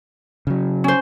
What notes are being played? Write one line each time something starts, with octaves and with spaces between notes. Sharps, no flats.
C#3 F#3
C#4 C5